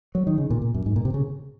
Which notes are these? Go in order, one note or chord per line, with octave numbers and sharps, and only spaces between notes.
F#3
D#3
C#3
A#2
A#2
F#2
G#2
A#2
C3
C#3